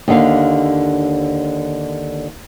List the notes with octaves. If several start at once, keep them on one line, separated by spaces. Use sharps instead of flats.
D#2 D3 F5